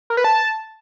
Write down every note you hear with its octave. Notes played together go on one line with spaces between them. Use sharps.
A#4
B4
A5